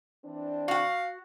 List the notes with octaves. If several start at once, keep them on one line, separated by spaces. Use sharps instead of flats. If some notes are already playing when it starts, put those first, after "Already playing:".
E3 C4 D4
F#4 F5 F#5